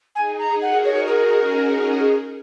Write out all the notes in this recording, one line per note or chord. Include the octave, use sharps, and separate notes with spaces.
D#4 G#4 G#5
A#5
F#4 A#4 F#5
C#5
D#4 G#4 A#4
C#4 F#4
C#4 F#4
D#4 G#4